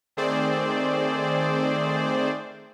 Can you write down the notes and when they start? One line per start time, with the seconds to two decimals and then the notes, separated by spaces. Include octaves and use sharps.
0.17 D#3 A3 C4 G#4 C5 D5